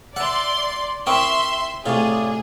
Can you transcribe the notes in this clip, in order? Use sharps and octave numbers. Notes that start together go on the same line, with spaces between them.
D5 E5 F#5 C6
C4 E4 A#4 E5 G5 C6 C#6 D#6
A2 C3 F4 G#4 C#5 D5